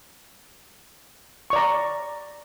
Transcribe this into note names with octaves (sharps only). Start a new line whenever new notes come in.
D5 A#5 C#6